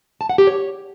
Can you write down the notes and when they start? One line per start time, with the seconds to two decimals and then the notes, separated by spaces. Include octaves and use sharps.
0.21 A5
0.29 F#5
0.38 G4
0.47 C#5